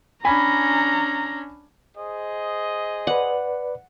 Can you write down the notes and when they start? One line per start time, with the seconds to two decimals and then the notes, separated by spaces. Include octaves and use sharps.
0.25 C#4 D4 G#5 A#5 B5
1.96 G#4 C5 D#5
3.07 B4 D5 F#5